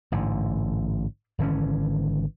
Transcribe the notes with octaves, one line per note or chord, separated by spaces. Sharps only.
A1 G#2 D3
G#1 D3 E3 C#4